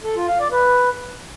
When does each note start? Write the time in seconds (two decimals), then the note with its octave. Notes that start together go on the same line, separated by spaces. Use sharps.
0.04 A4
0.16 F4
0.28 F5
0.40 D5
0.52 B4